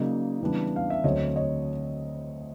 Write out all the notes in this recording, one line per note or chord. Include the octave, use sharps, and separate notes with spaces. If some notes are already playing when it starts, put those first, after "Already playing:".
Already playing: C#3 F#3 A#3 D#4 D5
C#3 E3 G3 B3 D4
F5
E5
D2 D3 F#3 A3 C4 C#5 D#5
C#5 D#5